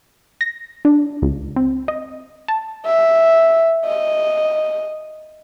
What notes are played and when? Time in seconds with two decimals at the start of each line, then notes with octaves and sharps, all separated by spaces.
0.41 A#6
0.85 D4
1.22 C#2
1.56 C4
1.88 D#5
2.48 A5
2.86 E5
3.85 D#5